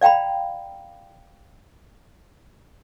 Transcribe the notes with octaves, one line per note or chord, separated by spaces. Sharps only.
D5 F5 G5 A#5 B5